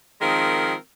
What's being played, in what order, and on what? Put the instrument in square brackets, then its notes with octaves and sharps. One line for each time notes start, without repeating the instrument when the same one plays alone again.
[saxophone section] D#3 F3 G#3 C4 A#4